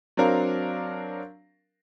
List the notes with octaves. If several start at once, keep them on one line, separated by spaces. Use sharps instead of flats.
F#3 C4 D4 A#4 F5